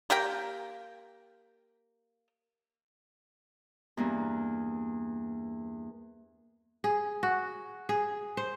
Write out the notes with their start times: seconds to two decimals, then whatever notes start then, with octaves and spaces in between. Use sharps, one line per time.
0.10 A#3 G4 A#4 G5
3.97 E2 G2 A#3
6.84 G#4
7.23 F#4
7.89 G#4
8.37 C5